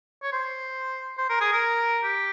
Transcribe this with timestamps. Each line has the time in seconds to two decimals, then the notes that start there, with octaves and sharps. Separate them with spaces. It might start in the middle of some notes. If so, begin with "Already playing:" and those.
0.23 C#5
0.33 C5
1.17 C5
1.29 A#4
1.40 G#4
1.52 A#4
2.03 G4